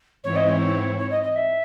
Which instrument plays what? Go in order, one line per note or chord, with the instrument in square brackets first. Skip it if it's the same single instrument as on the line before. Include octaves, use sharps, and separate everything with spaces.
[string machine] G#2 E3 C4 E4 [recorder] C#5
[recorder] D#5
C#5
C#5
D#5
D#5
E5